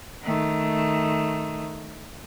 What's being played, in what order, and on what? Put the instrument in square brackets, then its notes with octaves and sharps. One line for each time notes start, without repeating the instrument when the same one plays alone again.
[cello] D#3 A3